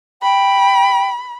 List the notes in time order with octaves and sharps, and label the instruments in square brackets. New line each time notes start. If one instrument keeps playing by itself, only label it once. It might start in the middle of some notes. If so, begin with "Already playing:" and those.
[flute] G5 [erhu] B5